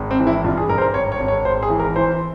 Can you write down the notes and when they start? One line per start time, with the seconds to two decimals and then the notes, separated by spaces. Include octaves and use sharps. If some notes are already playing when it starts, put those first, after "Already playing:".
Already playing: G#1
0.11 C4
0.19 E3
0.27 E4
0.44 G2 F4
0.57 G#4
0.69 G2 A#4
0.78 C5
0.81 A#4
0.94 G#1 C#5
1.12 C#5
1.20 G#1
1.28 C#5
1.45 G#1 C5
1.63 G#4
1.70 E3
1.79 A#4
1.96 E3 C5